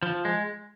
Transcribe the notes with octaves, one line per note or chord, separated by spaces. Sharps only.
F3
G#3